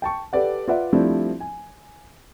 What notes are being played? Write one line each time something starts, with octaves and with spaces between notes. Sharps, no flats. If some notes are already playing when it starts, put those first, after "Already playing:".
G5 A5 C#6
G4 A4 B4 D5 F#5
F4 B4 D5 E5 F#5
F3 G3 A3 C4 D4 E4
G#5